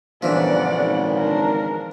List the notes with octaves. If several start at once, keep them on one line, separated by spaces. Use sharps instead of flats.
G1 A#2 C#3 E3 F3 D5 F#5
G#1
D4 A#4